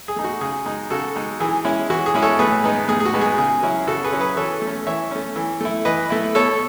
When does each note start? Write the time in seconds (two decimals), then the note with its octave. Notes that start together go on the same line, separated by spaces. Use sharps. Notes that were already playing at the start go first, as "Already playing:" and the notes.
0.08 G#4
0.16 A3 D#4
0.24 F#4
0.41 C#3 G#4
0.66 G#3 D#4
0.90 C#3 F#4 A4
1.16 G#3 D#4
1.40 E3 G#4
1.65 G#3 C#4 E4
1.90 E3 F#4
2.06 G#4
2.15 G#3 C#4 E4
2.22 A4 C#5
2.39 A2 G#4 B4
2.64 G#3 B3 D#4
2.88 A2 G#4
3.00 G#4
3.05 F#4
3.13 G#3 B3 D#4
3.21 G#4
3.38 C#3 G#4
3.63 F#3 C#4 E4
3.87 C#3 F#4 A4
4.04 G#4 B4
4.12 F#3 C#4 E4
4.21 G#4 B4
4.37 E3 A4 C#5
4.62 A3 C#4
4.87 E3 C#5 E5
5.11 A3 C#4
5.36 E3
5.61 A3 E4
5.85 E3 B4 D#5
6.10 A3 E4
6.35 B2 A4 C#5